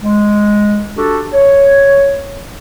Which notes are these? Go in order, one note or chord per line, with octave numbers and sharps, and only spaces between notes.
G#3
D4 F#4 G4 A4
C#5